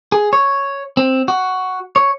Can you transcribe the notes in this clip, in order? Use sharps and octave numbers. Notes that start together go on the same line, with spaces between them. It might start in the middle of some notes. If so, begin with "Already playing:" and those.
G#4
C#5
C4
F#4
C#5